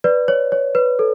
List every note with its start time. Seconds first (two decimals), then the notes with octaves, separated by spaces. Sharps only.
0.04 B4 D5
0.28 C#5
0.52 C#5
0.75 B4
0.99 A4